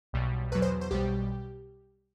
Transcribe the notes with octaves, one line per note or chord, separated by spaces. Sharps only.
B1 B2 G3
E2 B2 F#3 B4
C5
C5
B1 B2 G3 G4